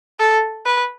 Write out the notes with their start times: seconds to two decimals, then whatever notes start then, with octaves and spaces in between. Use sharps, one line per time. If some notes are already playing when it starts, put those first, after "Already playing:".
0.20 A4
0.66 B4